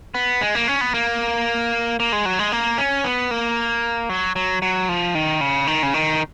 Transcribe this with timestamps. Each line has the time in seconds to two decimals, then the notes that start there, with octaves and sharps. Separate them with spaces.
0.14 B3
0.41 G#3
0.55 A#3
0.68 C#4
0.81 B3
0.94 A#3
2.00 A#3
2.12 G#3
2.25 F#3
2.39 G#3
2.52 A#3
2.78 C#4
3.04 B3
3.31 A#3
4.09 F#3
4.36 F#3
4.62 F#3
4.89 F3
5.15 D#3
5.41 C#3
5.67 D#3
5.83 C#3
5.94 D#3